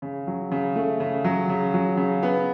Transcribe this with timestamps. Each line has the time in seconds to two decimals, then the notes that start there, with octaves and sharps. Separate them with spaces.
0.02 C#3
0.27 F#3
0.51 C#3
0.76 A3
1.00 C#3
1.24 F#3
1.49 C#3
1.74 F#3
1.97 C#3
2.23 B3